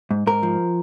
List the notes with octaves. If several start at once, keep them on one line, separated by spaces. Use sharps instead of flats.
G#2
G#2 A#4
F3